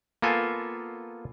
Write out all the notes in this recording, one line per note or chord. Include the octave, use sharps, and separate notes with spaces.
A#3 B3 F4 A4 G#5